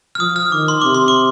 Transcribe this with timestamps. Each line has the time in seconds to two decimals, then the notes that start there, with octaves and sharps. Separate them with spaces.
0.15 F6
0.19 F3 D#6
0.36 F6
0.52 D#3 D6
0.68 C6
0.81 C3 D6
0.95 C6
1.08 D6